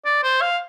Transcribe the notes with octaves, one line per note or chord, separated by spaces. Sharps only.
D5
C5
F5